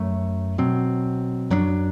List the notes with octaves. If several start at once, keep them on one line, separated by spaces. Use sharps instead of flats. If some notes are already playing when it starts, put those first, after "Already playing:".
Already playing: F#2 F#3 A3
B2 F#3 C4
F#2 F#3 B3 D4